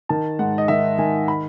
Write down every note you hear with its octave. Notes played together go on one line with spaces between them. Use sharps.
D#3 A5
G#2 F#5
D#5
D#3 E5
D#3 G#5
B5